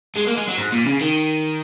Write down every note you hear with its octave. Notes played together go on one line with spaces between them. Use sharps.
G#3
A#3
G#3
F#3
G#2
A#2
C#3
D#3